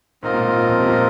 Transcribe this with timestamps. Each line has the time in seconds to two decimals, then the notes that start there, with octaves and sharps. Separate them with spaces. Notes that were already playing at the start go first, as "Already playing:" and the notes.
0.23 G#2 C4 F4 A#4 D#5
0.34 A#2
0.46 G#2
0.57 A#2
0.69 F2 G#2
0.80 C3
0.88 A#2